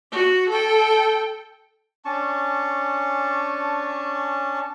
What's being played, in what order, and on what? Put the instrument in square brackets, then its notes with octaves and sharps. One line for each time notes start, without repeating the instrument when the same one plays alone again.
[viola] F#4
A4 G5
[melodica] C#4 D4 A5 C#6